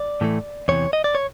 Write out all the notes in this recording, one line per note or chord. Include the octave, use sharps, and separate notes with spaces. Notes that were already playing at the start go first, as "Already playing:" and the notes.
Already playing: D5
A2 E3 A3
E2 C3 E3 C#5
D#5
D5
C#5